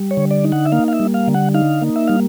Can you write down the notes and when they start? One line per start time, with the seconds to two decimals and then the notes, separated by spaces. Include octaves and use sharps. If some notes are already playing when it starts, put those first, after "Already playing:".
Already playing: G3
0.11 C#5
0.17 D3
0.31 D5
0.44 D#4
0.52 F#5
0.65 E5
0.72 A#3 F5
0.88 F5
0.93 E5
1.00 G3
1.14 F5
1.28 D3
1.34 F#5
1.54 D#4 F5
1.82 A#3
1.96 E5
2.08 G3 F5